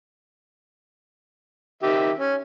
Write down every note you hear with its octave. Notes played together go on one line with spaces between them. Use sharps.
D#3 G4 E5
C#4